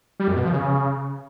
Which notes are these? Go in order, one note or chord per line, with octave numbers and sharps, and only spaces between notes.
G3
F#2
B2
F3
C#3